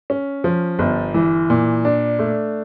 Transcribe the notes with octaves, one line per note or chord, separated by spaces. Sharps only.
C#4
F3
G1
E3
A#2
D4
A3